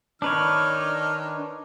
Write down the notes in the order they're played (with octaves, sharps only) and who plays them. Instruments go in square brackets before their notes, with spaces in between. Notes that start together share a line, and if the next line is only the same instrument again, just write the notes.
[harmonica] D#3 D#4 F6 [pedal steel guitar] D4 B4 C#5